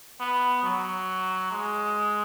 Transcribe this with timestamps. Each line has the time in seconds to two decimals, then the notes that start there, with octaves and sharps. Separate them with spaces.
0.20 B3
0.63 F#3
1.52 G#3